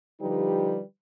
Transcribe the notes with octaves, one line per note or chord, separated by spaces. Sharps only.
D3 F3 G3 D#4 G4 B4